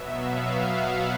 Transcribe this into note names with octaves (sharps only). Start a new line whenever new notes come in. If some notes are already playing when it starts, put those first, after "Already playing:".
Already playing: B2 F#3 B3 E5
F5
F#5